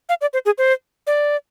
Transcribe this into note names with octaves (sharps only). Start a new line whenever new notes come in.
F5
D5
C5
G#4
C5
D5